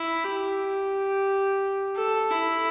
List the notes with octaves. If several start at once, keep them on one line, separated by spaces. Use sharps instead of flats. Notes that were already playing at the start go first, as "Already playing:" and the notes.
Already playing: E4
G4
A4
E4